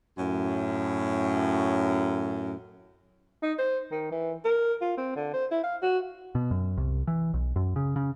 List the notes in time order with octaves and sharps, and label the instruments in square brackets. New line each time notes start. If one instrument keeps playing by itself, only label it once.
[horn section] F#2 A2
[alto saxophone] D#4
C5
D#3
E3
A#4
F4
C4
D3
C5
E4
F5
F#4
[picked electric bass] B2
F#2
C2
E3
B1
F#2
C#3
C#3